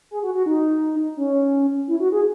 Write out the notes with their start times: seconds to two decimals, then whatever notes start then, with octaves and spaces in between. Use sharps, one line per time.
0.11 G#4
0.23 F#4
0.34 F#4
0.46 D#4
1.17 C#4
1.88 E4
2.00 F#4
2.12 G#4